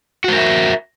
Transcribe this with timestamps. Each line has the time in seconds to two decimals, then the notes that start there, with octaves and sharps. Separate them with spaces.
0.24 F#4
0.28 C5
0.32 A#4
0.36 E5